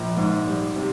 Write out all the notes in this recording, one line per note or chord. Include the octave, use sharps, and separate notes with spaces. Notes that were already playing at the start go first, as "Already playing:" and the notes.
Already playing: A#1
G#2
G3
C3